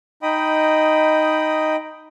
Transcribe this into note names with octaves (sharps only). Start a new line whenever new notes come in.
D#4 D#5 G5 B5 D#6